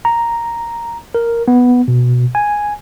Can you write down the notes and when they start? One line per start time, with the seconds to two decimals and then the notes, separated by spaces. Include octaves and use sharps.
0.05 A#5
1.15 A#4
1.48 B3
1.88 B2
2.35 G#5